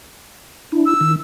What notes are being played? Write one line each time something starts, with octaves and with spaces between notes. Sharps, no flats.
D4 E4
E6
D#3